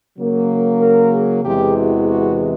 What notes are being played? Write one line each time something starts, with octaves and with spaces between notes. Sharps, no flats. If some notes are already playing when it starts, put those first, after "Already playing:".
C#3 F#3 A#3
A#4
G#4
E2 C3 E3 G#3 G4
F#4
F#4